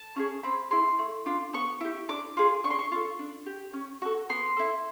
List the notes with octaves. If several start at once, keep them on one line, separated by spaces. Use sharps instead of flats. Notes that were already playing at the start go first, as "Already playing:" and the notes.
Already playing: A5
C#4 F4 G#4
C4 B5
E4 G#4 C6
A3
D4 F4
B3 C#6
E4 G4
D4 D6
F4 G#4
D4 C#6
C6
C#6
F4 A4
D4
G4
C#4
F#4 A4
B3 C6
E4 A4